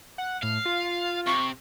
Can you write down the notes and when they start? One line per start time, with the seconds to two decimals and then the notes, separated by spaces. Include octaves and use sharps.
0.18 F#5
0.43 A2 F5
0.65 F4
1.26 C3 C#6